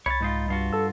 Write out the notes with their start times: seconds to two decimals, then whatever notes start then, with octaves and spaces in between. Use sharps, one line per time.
0.06 C2 C#5 B5 A6
0.21 G#2 D#4 F4
0.48 G2 F4 F#4
0.73 A4 E6